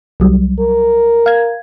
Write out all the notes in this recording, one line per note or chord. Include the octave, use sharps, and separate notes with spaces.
C2 F#3 G3
A#4
F5 G#6